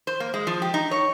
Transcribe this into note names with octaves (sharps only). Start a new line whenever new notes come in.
C5
A#3
G#3
F3
G4
D#4
C#5